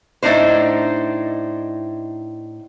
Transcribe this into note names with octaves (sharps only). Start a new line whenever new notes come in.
A2 D#3 D4 D#4 C5